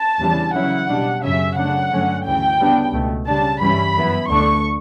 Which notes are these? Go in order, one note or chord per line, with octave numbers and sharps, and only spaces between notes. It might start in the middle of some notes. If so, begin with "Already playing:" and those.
Already playing: A5
E2 C#3 E3 G3 D4
C#3 F#3 C#4 E4 F#5
B2 G3 D4
F#2 C#3 F#3 C#4 E5
C#3 F#3 A3 D4 F#5
G2 D3 F#3 A3 C#4
D2 C#3 E3 G5
C#3 G3 B3 D4
C#2 B2 A3
C#3 G3 D4 A5
G2 E3 G3 C#4 E4 B5
F#2 E3 B3 E4
D2 D3 A3 D4 C#6